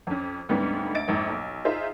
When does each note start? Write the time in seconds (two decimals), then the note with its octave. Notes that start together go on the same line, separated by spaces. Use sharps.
0.07 F2 C#4
0.49 D2 G#2 D3 G3 B3 C#4
0.94 D2 D#5 A6 D7
1.08 A#1 F2 G#2
1.30 B1
1.65 D#4 F4 G#4 C5 E5